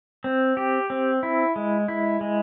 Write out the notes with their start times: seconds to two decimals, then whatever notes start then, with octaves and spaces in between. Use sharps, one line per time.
0.24 C4
0.57 G4
0.90 C4
1.23 E4
1.56 G#3
1.88 E4
2.21 G#3